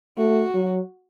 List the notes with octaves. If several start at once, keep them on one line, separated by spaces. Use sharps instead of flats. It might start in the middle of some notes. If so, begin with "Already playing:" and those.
A3 F#4
F#3